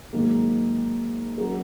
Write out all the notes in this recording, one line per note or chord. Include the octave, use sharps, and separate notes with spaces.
G#2 D#3 F#3 A#3
F#3 C#4 F#4 A#4